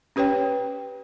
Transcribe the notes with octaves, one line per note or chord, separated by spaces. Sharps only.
C#4 G4 B4 C#5 G5